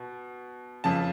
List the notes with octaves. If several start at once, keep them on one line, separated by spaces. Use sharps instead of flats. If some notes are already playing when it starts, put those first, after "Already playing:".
Already playing: B2
F2 C#3 A5